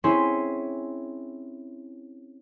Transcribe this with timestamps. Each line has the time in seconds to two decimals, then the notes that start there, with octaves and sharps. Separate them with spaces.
0.04 C4 C#4 E4 G#4 E5 C6